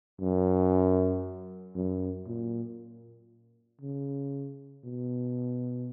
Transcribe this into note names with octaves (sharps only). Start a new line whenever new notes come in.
F#2
F#2
A#2
C#3
B2